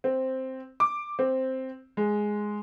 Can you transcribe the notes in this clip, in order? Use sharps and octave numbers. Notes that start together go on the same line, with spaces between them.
C4
D6
C4
G#3